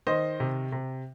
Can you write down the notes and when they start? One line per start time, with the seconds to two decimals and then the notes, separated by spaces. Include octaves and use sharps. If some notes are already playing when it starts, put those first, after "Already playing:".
0.07 D#3 C5 D#5
0.40 C3
0.72 C3